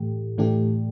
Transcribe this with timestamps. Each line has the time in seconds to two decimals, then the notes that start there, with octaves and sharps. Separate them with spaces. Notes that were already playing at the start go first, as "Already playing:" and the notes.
Already playing: A2 E3 A3 G4
0.38 A2 E3 A3 D4 G4